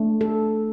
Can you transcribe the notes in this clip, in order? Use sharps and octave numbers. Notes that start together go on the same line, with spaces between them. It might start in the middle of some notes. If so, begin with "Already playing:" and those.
Already playing: A3 D4
A4